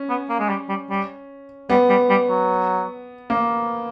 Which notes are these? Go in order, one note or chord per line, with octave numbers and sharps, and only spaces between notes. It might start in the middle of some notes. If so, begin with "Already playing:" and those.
Already playing: C#4
B3
A#3
G#3
G3
G3
G3
G3 B3
G3
G3
F#3
A#3